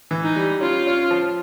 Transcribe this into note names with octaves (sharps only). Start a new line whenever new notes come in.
E3
D#4
G3
C#4 F4
C#4
F3